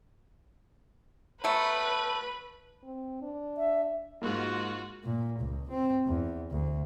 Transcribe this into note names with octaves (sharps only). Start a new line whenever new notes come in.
F#3 A3 B3 B4
C4
D4
E5
G#2 A#3 F4 F#4
A#2
C#2
C4
E2
D2